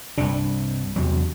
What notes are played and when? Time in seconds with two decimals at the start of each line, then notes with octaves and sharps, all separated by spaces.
0.18 C2 G2 C3 D4
0.96 E2 C3 F#3